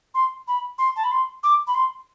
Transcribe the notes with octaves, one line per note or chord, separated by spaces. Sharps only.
C6
B5
C6
A5
B5
C6
D6
B5
C6